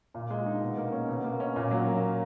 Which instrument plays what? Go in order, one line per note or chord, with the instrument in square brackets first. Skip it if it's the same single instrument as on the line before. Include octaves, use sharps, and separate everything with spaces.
[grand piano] A#2
G#3
D#4
B2
A#3
C#4
B2
A#3
C#4
A#2
F#3
A#3